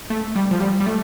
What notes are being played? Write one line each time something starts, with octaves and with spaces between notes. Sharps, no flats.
A3
G3
F3
G3
G3
A3